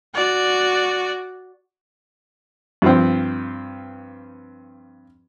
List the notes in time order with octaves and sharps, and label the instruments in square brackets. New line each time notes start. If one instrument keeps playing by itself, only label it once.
[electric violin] F#4 D5
[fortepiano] G2 F3 C4